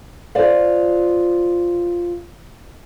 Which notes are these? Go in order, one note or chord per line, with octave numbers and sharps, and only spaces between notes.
F4 C5 D5 F5